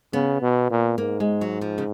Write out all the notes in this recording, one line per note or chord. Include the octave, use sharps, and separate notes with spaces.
C#3 B3
B2
A#2
G#2 A#3
G#3
F#3
F3
C#3